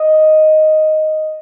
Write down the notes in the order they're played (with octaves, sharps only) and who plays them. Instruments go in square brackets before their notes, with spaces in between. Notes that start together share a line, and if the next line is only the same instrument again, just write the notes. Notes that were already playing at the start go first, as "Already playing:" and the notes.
Already playing: [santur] D#5